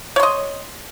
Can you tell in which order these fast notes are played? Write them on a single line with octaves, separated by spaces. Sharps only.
C#5 C6 D#5